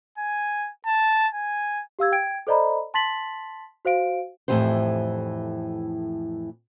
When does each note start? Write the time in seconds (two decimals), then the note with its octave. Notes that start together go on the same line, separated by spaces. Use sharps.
0.18 G#5
0.86 A5
1.34 G#5
1.99 G4 F5 E6 G#6
2.12 G5 G#6 D7
2.47 A4 C5 D5 D#5 A#5 B5
2.94 A5 C6 A6 B6 F#7
3.85 F#4 C5 F5 D7
4.48 F2 A2 C3 E3 G4 C5